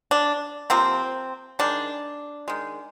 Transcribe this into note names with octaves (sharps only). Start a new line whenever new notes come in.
D4
C3 F3 A#3 C4
D#3 G#3 D4
D#3 G#3